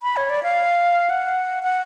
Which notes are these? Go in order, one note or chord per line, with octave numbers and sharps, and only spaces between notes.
B5
C#5
D5
F5
F#5
F#5